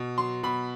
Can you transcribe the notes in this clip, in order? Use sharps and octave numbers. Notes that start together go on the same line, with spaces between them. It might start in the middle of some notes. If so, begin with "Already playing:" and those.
Already playing: B2
F#3 C6
B2 B5